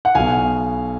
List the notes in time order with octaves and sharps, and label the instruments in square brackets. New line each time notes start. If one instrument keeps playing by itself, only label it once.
[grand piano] F#5
B1 B2 F5 G#5